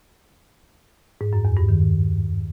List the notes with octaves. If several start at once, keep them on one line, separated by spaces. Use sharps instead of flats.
G#2
F#2
E2
G2
D#3